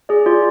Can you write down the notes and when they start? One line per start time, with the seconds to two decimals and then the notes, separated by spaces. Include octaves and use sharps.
0.09 G#4 D5
0.26 F4 D5